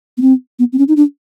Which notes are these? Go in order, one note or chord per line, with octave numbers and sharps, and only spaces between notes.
B3
C4
B3
C4
C#4
D#4
D4